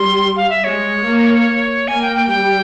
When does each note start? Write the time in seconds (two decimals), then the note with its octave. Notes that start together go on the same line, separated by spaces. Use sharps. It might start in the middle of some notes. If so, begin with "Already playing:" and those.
Already playing: G3 C6
0.37 F5
0.50 E5
0.64 G#3 C#5
1.05 A#3
1.88 A#3 G#5
2.02 G5
2.16 G5
2.29 G3 G5